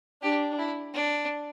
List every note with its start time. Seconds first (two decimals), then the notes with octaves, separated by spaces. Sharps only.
0.23 D4 G4
0.59 E4
0.94 D4